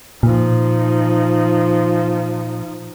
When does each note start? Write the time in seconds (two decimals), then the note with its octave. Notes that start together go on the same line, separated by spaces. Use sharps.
0.23 A#2 F3 D#4